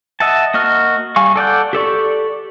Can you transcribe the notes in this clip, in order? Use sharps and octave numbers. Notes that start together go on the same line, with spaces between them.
D#5 E5 F#5 A5
A#3 F#4 D#5 F6
G3 F5 G#5 C#6
A4 D5 F#5 G6
G4 A4 D5 C#6